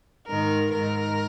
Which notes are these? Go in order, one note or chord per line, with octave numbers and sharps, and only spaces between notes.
G#2 D#3 A#4
G#2 D#3 A#4